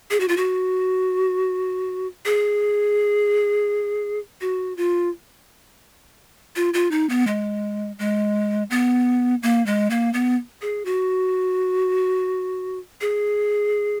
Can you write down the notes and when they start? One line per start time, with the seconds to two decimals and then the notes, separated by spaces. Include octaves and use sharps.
0.11 G#4
0.20 F#4
0.28 F4
0.37 F#4
2.26 G#4
4.41 F#4
4.77 F4
6.56 F4
6.74 F4
6.91 D#4
7.09 B3
7.27 G#3
7.99 G#3
8.71 B3
9.43 A#3
9.66 G#3
9.90 A#3
10.14 B3
10.62 G#4
10.85 F#4
13.01 G#4